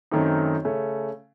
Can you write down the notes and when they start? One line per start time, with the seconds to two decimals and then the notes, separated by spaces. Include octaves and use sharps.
0.11 F#2 D#3 A3 C4 D#4
0.65 C#3 A3 C#4